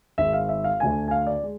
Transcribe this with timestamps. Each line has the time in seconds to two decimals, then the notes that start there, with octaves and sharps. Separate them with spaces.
0.18 G#1 G#2 G#3 E5
0.33 F5
0.49 E5
0.64 F5
0.80 D2 D3 A3 D4 G#5
1.08 G#5
1.11 F5
1.27 D5
1.43 G#3